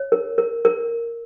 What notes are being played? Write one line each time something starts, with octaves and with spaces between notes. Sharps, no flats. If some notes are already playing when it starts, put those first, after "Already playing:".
Already playing: C#5
A#4
A#4
A#4